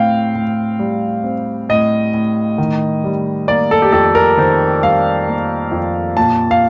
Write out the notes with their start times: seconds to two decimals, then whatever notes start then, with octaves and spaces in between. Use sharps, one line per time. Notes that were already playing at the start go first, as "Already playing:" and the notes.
Already playing: A2 C4 F5 G5
0.35 A2
0.79 G3
1.24 C4
1.69 A2 D#5
2.14 A2
2.58 D#3
3.04 G3
3.48 A#3 D5
3.71 A4
3.82 G4
3.92 F2 A4
4.15 A#4
4.37 D#3 C5
4.83 G3 F5
5.27 A#3
5.72 F2
6.17 A#2 A5
6.51 F5